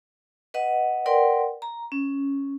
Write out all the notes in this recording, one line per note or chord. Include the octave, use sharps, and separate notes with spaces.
B4 D#5 F#5
A#4 B4 D5 F#5 G5 C6
A#5
C#4